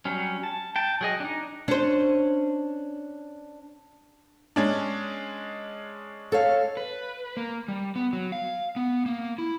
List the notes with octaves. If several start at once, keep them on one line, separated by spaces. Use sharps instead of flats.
F#3 G3 C#4
A5
G5 A5
F#3 G#4 D#5
D4 D#4
C#4 D4 C5
G#3 C#4 D4
A4 C#5 F5
B4
A#3
G3
B3
F#3
F5
B3
A#3
E4